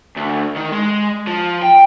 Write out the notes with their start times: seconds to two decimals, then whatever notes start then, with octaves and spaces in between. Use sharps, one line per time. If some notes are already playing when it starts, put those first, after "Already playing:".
0.17 D2
0.56 D#3
0.72 G#3
1.27 F3
1.62 G5